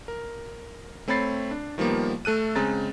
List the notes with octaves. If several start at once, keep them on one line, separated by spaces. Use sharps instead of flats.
A#4
A3 C4 C#5 B5 A6 C7
D4
D#3 F3 G3 A#3 B3
A3 A4 F#6 D#7
C#3 G#3 C4 A#5 A6